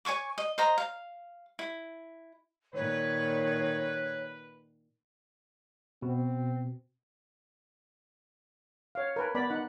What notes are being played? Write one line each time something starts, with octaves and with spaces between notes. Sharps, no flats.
C#5 G#5 C#6 D6
D#5
C5 D#5 A#5
F5
E4
A#2 D#3 B4 C#5
B2 C4
C#5 F5
A#4 B4 G#5
B3 D5 B5
D#4 F#5